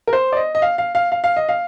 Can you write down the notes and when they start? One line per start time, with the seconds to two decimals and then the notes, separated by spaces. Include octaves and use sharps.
0.07 A#4
0.13 C5
0.33 D5
0.37 D#5
0.55 D#5
0.62 F5
0.78 F5
0.95 F5
1.12 F5
1.24 F5
1.36 D#5
1.49 F5